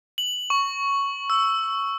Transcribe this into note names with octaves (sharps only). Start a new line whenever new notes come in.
F#7
C#6
E6